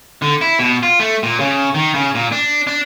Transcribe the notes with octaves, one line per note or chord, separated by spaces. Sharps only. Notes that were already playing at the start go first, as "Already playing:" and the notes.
D3
E4
B2
F4
A3
A#2
C#3
D#3
C#3
A#2
D4
D4